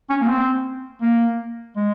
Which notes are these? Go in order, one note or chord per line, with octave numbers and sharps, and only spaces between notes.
C#4
A#3
C4
A#3
G#3